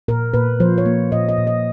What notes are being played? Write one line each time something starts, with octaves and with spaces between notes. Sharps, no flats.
A#2 A#4
A#2 B4
F3 C5
C#5
A#3
A#2 D#5
D#5
A#2
D#5